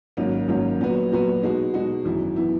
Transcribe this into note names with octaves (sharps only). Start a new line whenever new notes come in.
G#1 G#2 F#3 A#3 C#4
G#1 G#2 F#3 A#3 C#4
A#2 F#3 B3 F#4 B4
A#2 F#3 B3 F#4 B4
B2 G#3 D#4 F#4
B2 G#3 D#4 F#4
G#1 F#2 E3 B3 E4
E3 B3 E4